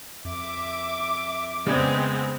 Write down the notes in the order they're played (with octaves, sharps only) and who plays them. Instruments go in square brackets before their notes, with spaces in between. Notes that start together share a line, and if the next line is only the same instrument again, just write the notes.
[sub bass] F2 [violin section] E5 D6
[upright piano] C#3 D5 G#6 [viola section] G#3 B3 C4